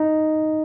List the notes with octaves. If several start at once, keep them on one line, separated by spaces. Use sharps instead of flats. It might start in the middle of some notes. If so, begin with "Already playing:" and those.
Already playing: D#4